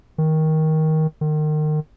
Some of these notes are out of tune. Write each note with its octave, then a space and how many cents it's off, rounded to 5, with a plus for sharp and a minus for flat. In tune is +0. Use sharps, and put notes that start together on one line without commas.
D#3 +15
D#3 -30